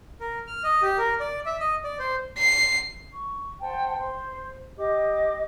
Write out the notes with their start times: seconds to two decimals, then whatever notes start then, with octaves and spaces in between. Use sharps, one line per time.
0.20 A#4
0.47 F6
0.64 D#5
0.82 G4
0.98 A#4
1.20 D5
1.46 E5
1.60 D#5
1.84 D5
1.99 C5
2.39 C7
3.11 C#6
3.61 C5 F#5 G5 A5
3.96 C5
4.77 G4 D#5 D6